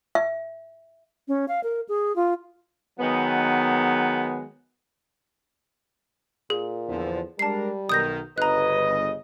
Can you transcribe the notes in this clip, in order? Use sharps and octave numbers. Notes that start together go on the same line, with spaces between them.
E5
C#4
F5
A#4
G#4
F4
D#3 F#3 G#3 B3
A#2 G#4
E2 D3 F3
G3 G#3 D4 A#4 A5 C7
B1 D#3 D#6 G6 A#6
G1 C#3 B4 D#5 A#5 F#6